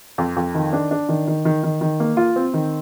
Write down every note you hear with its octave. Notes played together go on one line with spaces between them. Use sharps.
F2
F2
D#3
D4
D4
D#3
D#3
D#3
D#3
D#3
A#3
F4
C4
D#3